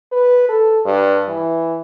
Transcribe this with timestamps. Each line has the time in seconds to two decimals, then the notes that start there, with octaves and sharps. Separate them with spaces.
0.12 B4
0.49 A4
0.85 G2
1.28 E3